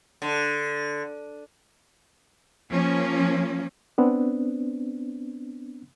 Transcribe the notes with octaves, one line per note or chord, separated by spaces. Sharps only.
D3
F3 A#3 C#4
B3 C4 D4